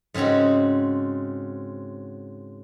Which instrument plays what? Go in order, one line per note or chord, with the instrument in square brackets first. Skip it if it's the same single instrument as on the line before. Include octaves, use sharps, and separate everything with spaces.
[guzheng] G#2 C#3 C4 C#4 F#4